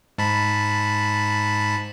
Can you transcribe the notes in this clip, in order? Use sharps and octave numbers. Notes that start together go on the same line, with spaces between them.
G#2 A5 B5